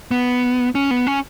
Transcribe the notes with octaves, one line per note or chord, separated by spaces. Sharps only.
B3
C#4
B3
C#4